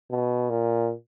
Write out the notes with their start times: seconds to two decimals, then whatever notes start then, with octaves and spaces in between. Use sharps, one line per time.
0.10 B2
0.50 A#2